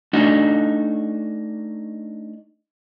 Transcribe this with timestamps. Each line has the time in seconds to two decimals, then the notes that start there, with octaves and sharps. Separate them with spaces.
0.13 A3 D4 D#4 F#4